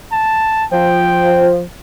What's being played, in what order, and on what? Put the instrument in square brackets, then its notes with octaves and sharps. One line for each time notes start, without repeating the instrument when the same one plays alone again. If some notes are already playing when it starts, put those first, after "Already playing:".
[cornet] A5
[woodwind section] F3 [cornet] G5